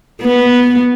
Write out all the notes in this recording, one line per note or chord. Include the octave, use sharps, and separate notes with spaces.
B3